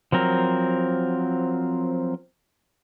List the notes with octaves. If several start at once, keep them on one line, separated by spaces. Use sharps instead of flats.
F3 F#3 C4 A#4